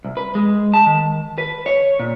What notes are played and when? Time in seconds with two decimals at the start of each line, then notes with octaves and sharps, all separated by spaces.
0.05 C2
0.17 B4
0.35 G#3
0.74 A5
0.86 D#3
1.38 B4
1.66 C#5
2.00 A#2